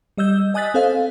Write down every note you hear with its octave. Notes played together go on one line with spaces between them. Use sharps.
G3 D#5 E6 G6
D#5 G#5 D#6 F#6 A6 B6
C4 A4 C5 F5